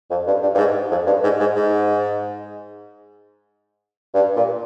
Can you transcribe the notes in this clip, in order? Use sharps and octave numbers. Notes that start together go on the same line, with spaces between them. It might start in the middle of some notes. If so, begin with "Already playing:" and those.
F2
G2
G2
G2
G#2
F2
G2
G#2
G#2
G#2
G2
A#2